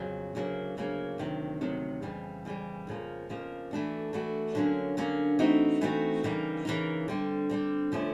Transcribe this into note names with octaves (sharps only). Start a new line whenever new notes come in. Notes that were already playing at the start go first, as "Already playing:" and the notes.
Already playing: F2 C#3 F#3
D2 C#3 F#3 A#3
D2 C#3 F#3 A#3
D2 C3 D#3 F#3
D2 C3 D#3 F#3
F2 C#3 E3 G3
F2 C#3 E3 G3
F2 C#3 F3 A#3
F2 C#3 F3 A#3
E3 A3 D4 F#4
E3 A3 D4 F#4
D3 F#3 A#3 C#4
D3 F#3 A#3 C#4
E3 A3 C4 D#4 F#4
E3 A3 C4 D#4 F#4
C#3 E3 G3 A#3 D#4
C#3 E3 G3 A#3 D#4
D3 G3 C4
D3 G3 C4
D3 F3 A3 C#4 E4